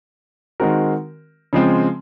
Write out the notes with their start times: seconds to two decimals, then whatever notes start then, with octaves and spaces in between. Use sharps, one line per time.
0.60 D#3 G#3 C4 F#4 A#4
1.53 C#3 F3 G#3 C4